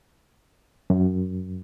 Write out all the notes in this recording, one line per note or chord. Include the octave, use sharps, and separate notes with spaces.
F#2